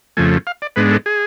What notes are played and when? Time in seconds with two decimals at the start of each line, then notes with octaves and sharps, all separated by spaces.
0.17 F2 C#3 F3 A3 G#5
0.47 F5
0.62 D5
0.76 G#2 G#3 B3 D4 B4
0.91 A4
1.06 G#4